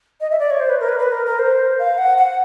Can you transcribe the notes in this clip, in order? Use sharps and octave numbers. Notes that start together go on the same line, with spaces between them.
D#5
E5
D5
C#5
C5
B4
A#4
B4
B4
A#4
A#4
C5
F5
F#5
F#5